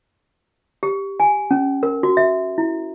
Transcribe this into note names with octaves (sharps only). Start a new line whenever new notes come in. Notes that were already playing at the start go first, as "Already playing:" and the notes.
G4
G#5
C#4
A#4
F#4
E5
E4